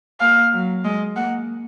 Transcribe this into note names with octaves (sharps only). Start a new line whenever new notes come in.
A#3 F5
F#3
G#3 D#5
A#3 F#5